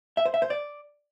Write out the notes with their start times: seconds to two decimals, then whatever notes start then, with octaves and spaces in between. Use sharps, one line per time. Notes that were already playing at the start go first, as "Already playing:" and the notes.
0.17 E5
0.26 C5
0.34 E5
0.42 C5
0.50 D5